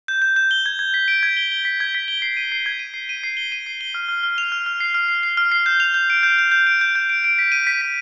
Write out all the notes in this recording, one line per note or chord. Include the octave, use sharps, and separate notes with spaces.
G6
G6
G6
G7
G#6
G#6
B6
D7
G#6
G7
G7
B6
G#6
B6
G7
C7
D#7
C7
G#6
D#7
C7
D#7
C7
G7
D#7
C7
G7
F6
F6
F6
F7
F6
F6
C7
F6
C7
C7
F6
C7
G6
F7
G6
D7
G6
G6
G6
D7
G6
G6
D7
D7
B6
D#7
B6
B6